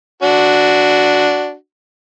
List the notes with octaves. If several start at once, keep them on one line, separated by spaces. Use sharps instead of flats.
D4 F#4